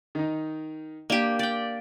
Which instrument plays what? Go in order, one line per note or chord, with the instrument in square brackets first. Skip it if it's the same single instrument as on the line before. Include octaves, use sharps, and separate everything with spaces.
[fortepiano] D#3 D#4
[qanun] A#3 G4 [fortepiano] D4
[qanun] D5 G5